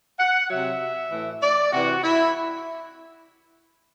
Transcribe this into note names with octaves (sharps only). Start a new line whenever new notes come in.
F#5
C3 F#3 E5
A2 E3
D5
C3 E3 F#4
E4